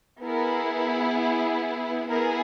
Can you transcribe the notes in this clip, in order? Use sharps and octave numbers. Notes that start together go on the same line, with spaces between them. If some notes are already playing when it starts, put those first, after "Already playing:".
B3 E4 G#4 A#4
B3 E4 G#4 A#4